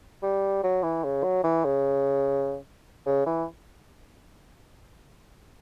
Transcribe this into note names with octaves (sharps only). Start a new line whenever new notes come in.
G3
F#3
E3
C#3
F#3
E3
C#3
C#3
E3